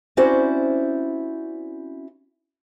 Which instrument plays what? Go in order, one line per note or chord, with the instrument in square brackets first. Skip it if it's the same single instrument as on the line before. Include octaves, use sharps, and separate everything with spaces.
[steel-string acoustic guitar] C4 C#4 E4 F#4 C5 D5